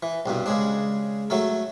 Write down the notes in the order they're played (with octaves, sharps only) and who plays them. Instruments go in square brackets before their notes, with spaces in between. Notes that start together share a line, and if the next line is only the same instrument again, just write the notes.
[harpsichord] E3
C2 G2 B2
C#3 G#3 D4
F#3 A3 A4